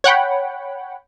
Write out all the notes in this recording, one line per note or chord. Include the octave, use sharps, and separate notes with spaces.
C#5 F#5 G5 B5